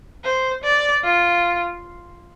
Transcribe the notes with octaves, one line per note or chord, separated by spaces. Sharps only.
C5
D5
F4